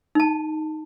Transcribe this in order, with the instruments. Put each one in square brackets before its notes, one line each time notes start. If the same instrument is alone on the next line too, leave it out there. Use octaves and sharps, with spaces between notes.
[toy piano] D#4 A5